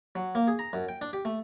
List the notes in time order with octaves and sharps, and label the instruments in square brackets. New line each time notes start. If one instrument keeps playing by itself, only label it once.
[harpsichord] F#3
A#3
G#4
A#5
F#2
G5
D4
G4
A3